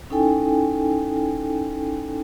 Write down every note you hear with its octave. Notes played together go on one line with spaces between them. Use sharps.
C#4 D#4 E4 A4 G5 G#5